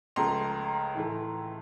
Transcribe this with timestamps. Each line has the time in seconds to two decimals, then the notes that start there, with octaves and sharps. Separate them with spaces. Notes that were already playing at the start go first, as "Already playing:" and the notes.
0.16 C#2 C#3 F3 A3 A#5 C6
0.95 A2 E3 A3